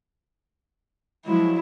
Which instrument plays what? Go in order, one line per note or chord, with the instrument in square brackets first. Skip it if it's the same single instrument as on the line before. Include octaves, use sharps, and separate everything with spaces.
[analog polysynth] F3 F#3 G#3 [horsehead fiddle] E4